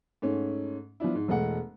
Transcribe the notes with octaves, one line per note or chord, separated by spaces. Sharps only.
G#2 A3 C#4
F3 B3 D4 E4
G#2
E1 G#3 A3 F#5